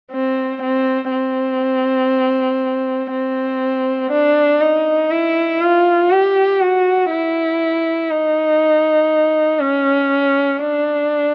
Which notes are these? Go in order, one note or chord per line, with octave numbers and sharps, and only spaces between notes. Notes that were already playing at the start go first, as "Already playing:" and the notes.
C4
C4
C4
C4
D4
D#4
E4
F4
G4
F#4
E4
D#4
C#4
D4